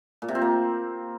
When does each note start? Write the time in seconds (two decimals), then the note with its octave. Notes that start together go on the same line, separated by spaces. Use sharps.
0.22 A#2
0.28 C3
0.35 C4
0.42 A#3